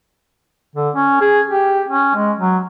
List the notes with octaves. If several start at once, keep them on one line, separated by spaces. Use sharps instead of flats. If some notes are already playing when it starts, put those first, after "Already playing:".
D3
C#4
G#4
G4
C#4
G#3
F#3